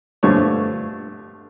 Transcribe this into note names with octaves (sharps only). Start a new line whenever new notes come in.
G2 D3 F3 A3 C#5